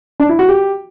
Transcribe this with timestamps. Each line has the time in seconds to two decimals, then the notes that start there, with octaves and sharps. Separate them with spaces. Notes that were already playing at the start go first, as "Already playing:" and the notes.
0.20 D4
0.29 E4
0.39 F#4
0.49 G4